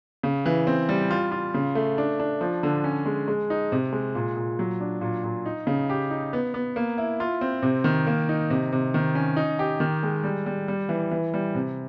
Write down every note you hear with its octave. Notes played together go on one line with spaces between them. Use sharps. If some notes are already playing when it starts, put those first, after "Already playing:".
C#3
E3
C4
G3
F4
F4
C#3
A3
D4
D4
F3
D3
C#4
G#3
G#3
D#4
C3
G#3
A#2
A#2
F#3
D4
A#2
A#2
D#4
C#3
G4
D#4
B3
B3
A#3
E4
F4
C4
C3
D#3
A#3
D#4
C3
C3
D#3
C#4
D#4
G4
D#3
G#3
G3
G3
G3
E3
E3
G3
C3